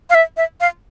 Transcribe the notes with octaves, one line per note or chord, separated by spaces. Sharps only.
F5
E5
E5
F5